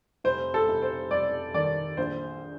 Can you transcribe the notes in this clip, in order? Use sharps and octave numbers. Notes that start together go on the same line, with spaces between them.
F1 C5
A4
F1
C5
F1 D5
D#3 D5
A#1 C5